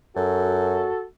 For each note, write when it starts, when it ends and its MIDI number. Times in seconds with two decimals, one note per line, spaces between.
0.16 0.88 42
0.16 1.06 66
0.16 1.02 69